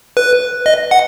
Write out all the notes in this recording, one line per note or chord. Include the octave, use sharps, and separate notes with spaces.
B4
D#5
F#5